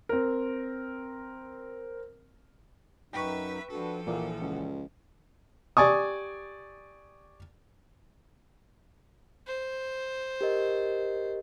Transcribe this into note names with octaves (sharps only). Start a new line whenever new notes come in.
C4 A#4
F#2 F#3 D#4 B4 E5 G5 C#6
F3 D4 F#4 A4 B4
A#1 A#2 E3 F#5
C#2
G4 D5 G#5 C#6 D#6
C5
G4 A#4 D#5